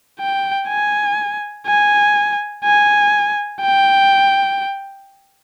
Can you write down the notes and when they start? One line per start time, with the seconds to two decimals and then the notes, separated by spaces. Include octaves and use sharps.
0.20 G5
0.68 G#5
1.66 G#5
2.64 G#5
3.62 G5